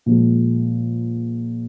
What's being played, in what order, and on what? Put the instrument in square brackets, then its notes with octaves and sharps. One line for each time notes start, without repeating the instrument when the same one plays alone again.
[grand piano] A#2 F3 G#3